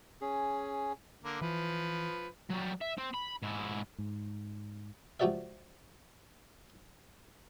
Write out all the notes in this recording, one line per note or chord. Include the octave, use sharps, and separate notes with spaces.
C#4 G#4
D3 A#3
E3 F3 B4
F#3 G3
E5
C4
B5
G#2 E4
G#2
C#2 F3 F#4 G4 D5 E5